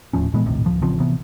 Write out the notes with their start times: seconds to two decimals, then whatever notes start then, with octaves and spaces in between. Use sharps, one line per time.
0.13 D#1 A2 F3 C#4
0.34 A#2 E3 G#3 B3
0.46 A#1 D#2 A2 C3
0.65 D1 F3
0.82 A1 C#3 F3 C4
1.00 C3 E3 B3